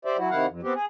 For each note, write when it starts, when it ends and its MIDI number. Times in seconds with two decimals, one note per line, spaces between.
0.05 0.17 67
0.05 0.17 72
0.05 0.17 74
0.05 0.17 76
0.18 0.30 54
0.18 0.30 64
0.18 0.30 66
0.30 0.46 48
0.30 0.46 51
0.30 0.46 64
0.30 0.46 77
0.30 0.46 78
0.47 0.61 41
0.63 0.73 59
0.63 0.73 60
0.63 0.73 67
0.75 0.85 68